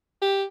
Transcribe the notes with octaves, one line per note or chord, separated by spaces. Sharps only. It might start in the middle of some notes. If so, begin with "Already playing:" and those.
G4